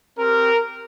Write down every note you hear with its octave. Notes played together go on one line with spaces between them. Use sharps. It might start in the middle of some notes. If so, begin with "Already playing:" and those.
C4 G4 A#4